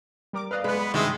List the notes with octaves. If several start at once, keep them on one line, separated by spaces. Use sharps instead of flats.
G3 A#4 D6
B4 D5 D#5 F5 F#6
G#3 B3 B4 F#6
B5
G2 C3 D#3 G#3 E4 D#5